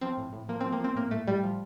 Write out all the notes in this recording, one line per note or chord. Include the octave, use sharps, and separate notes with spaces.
F3 C4
A2
A2
F3 A#3
F3 C4
A#3
F3 C4
A2 A#3
A2 A3
A2 G3
F3